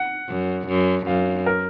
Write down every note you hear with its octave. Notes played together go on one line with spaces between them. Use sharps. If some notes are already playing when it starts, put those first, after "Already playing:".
Already playing: F#5
F#2
F#2
F#2 F5
A#4